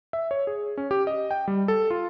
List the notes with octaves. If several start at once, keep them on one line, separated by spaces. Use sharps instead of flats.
E5
C#5
G#4
C#4
G4
D#5
G5
G3
A4
F4